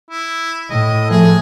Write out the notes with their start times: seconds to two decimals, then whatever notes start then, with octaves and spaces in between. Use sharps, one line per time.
0.10 E4
0.70 A2 D#5
1.10 F3 A3 G#4